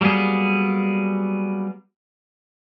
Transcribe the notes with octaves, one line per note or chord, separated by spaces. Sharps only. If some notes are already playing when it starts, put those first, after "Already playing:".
F#3 G3 A#3 B3 G#4